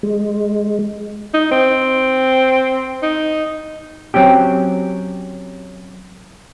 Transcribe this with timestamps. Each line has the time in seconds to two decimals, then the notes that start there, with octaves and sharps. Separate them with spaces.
0.03 G#3
1.34 D#4
1.51 C4
3.02 D#4
4.14 F#3 C4 C#4 G4